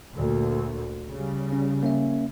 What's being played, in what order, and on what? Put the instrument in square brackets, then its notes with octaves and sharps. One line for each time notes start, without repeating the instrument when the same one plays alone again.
[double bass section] D2 A#2
C#3 G3
[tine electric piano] C#4
A#3 C#4 E5